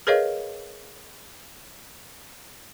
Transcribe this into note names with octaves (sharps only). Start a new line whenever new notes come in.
G#4 A#4 B4 C#5 D#5 F5